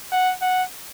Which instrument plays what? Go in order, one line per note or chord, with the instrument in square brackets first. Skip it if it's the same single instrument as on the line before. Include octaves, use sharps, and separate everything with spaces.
[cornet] F#5
F#5